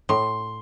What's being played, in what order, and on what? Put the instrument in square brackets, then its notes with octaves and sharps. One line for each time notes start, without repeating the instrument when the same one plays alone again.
[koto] A2 [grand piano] C6